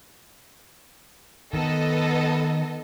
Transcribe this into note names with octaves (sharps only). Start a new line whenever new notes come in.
D#3 B3 A4 D#5